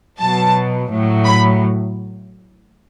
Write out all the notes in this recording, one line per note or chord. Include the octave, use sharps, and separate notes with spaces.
B2 F#3 A5
A2 F#3
B5